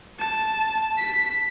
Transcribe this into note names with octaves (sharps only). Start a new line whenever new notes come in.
A5
B6